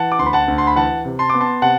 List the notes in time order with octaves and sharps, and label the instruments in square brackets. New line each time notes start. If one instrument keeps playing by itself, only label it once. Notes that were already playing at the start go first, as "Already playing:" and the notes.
Already playing: [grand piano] E3 F#5 A5
D6
D2 C6
B5
F#5 A5
D2
C6
B5
E3 F#5 A5
C3
A5 C6
B3 D6
A5 C6
C3 F#5 A5